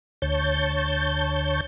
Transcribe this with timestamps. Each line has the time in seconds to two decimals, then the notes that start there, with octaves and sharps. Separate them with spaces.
0.22 D2 C#5 A5 G6